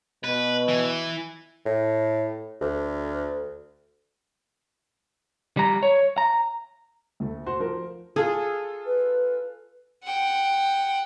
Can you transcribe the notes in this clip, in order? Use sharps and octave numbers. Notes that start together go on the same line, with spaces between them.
B2 B4
E3
A2
D2
G3 A#5
C#5
A#5
D2 A3
F#4 C5
F3 A#4 C5
F4 G#4 A4
B4
F#5 G5